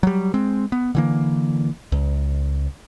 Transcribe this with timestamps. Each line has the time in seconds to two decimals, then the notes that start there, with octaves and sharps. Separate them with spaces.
0.03 F#3 G3
0.34 G#3 C4
0.72 B3
0.95 D3 E3 A#3
1.92 C#2